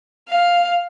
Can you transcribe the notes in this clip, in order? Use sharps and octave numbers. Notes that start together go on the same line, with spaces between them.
F5